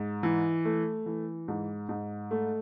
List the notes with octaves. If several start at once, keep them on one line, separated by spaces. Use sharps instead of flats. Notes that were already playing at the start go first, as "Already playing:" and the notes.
Already playing: G#2
E3
A3
E3
G#2
G#2
A3